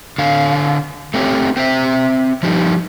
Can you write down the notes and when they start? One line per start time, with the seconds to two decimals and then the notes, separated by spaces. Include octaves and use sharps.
0.18 D3 F5
1.14 A3 C4 G4 C#5
1.57 C4 C5 E5
2.43 F3 G3 D#4